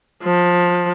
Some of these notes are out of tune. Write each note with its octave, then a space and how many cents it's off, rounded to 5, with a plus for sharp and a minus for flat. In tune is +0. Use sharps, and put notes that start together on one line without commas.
F3 +20